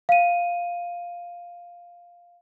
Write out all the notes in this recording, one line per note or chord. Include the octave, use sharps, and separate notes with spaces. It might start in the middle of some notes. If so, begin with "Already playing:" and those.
F5 D#7